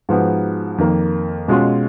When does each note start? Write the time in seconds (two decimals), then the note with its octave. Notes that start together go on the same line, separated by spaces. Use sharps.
0.09 G#2 F3 B3 F#4
0.78 F2 D#3 A#3
1.48 B2 G#3 C#4 F4